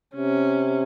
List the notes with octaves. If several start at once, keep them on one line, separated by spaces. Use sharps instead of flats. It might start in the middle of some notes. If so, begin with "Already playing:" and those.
C3 C#4